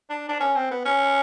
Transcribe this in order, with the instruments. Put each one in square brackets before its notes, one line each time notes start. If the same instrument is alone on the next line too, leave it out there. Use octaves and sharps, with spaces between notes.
[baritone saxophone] D4
D4
C#4
C4
B3
C#4